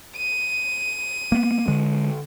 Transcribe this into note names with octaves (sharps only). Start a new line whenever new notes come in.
D#7
A#3 B3
D3 G#3